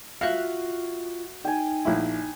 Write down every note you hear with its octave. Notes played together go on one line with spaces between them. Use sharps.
F4 F#4 E5 F5 F#6
D#4 G5 G#5
A#1 E4